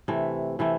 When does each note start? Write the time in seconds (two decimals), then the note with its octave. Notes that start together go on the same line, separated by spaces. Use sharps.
0.08 C3 E3 A3
0.59 C3 E3 A3